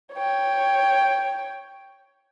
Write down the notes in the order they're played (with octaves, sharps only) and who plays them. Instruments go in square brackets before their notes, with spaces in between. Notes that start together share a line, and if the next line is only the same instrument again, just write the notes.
[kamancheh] C#5 G5